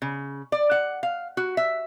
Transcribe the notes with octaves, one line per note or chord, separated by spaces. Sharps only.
C#3
D5
F#5
F5
F#4
E5